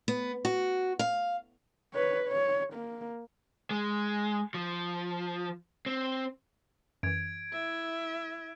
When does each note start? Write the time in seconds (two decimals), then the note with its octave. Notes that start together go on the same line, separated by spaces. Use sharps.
0.08 B3
0.45 F#4
0.99 F5
1.94 B4 C#5
2.28 C#5
2.74 A#3
3.71 G#3
4.54 F3
5.86 C4
7.03 F#2 E3 G#6 D7
7.52 E4 E5